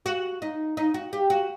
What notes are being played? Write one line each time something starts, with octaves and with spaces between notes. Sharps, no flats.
F#4
D#4
D#4
F#4
G4
F#4